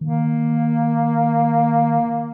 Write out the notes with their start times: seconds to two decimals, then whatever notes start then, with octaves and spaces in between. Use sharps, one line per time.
0.01 D#3 A#3